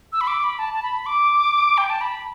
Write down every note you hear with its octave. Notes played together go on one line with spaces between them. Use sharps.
E6
B5
D6
B5
A5
A5
B5
B5
D6
G5
A5
B5